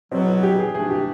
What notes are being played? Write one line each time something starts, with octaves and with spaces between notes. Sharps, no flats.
E2 B2 F#3 C4
F#4
G4
G#4
E3 A3 D4 G#4
G4